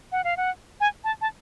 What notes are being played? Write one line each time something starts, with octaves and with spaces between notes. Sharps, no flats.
F#5
F5
F#5
G#5
A5
A5